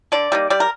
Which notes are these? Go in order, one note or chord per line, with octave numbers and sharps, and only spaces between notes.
D3 D5
G3 A#3 D#4
G3 D5
A#4